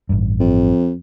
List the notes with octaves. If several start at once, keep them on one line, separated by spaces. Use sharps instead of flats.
A1 G2
F2